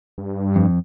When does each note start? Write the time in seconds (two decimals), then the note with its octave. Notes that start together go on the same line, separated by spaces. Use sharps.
0.18 G2
0.56 F2